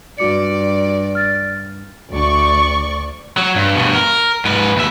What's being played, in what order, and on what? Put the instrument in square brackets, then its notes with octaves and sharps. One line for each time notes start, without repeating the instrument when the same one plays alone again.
[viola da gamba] G2 D5 [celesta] F#4 D6 C#7
[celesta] F6 A6
[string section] D2 D5 C#6
[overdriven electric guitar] F#3
G2
G2 B2
A#4
G#2 B4
D#2 E5